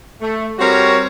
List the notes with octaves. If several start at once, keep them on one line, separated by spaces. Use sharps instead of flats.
A3
G3 C4 F#4 A#4 C#5